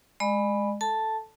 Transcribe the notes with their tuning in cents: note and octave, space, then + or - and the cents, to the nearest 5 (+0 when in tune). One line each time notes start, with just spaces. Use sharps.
G#3 +0 D5 +45 B5 +0
A4 +0 A5 +0